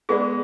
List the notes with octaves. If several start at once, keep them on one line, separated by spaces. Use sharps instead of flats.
G#3 B3 G#4 B4 D5